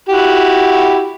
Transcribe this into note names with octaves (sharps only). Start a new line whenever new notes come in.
E4 F#4 G4